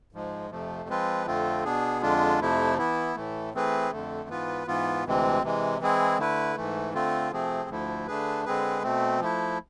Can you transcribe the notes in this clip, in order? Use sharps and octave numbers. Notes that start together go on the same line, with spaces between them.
G#2 F3 G#3
F2 C3 F3 A3
F3 G#3 C4 F4 B4
F2 D3 A3 C4 F4
B2 B3 D4 G#4
F2 D3 G#3 D4 F4
F2 C3 F3 A3 E4
E3 B3 E4
A2 E3 A3
E3 A3 C4 G#4 B4
F2 D3 A3
G#2 E3 B3 F4 B4
G#2 E3 B3 F4
D2 C3 E3 G#3 C4
C3 E3 G#3
E3 G#3 C4 E4 G#4
D3 A3 E4 B4
G#2 E3 A3
D3 A3 C4 F4
C3 F3 A3 C4 G#4
D2 D3 F3 A3 E4
D3 A3 D4 G#4 B4
D3 G#3 C4 G#4 B4
B2 A3 C4
F3 A3 E4